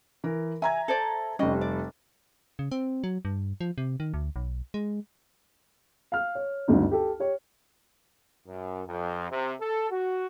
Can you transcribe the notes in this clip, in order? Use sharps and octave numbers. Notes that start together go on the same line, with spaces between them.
E3 A#4
E5 G#5 A#5 G#6
A4 C5 D5
F1 G3 C#4 G4 D#5
D5
C#3
C4
F#3
G2
F3
C3
D#3
D2
B1
G#3
F5 F6
C#5
G#1 D2 G2 D3 D#4
G4 A4
G4 C#5
F#2
F2
C3
A4
F#4